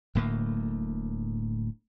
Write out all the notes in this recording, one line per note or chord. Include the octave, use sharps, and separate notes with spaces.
D1 D2 A2 A#3